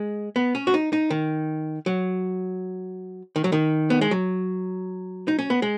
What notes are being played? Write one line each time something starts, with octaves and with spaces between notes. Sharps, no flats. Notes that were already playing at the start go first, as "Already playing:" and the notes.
Already playing: G#3
B3
C#4
F#4
D#4
D#4
D#3
F#3
D#3
F#3
D#3
B3
G#3
F#3
D#4
C#4
B3
G#3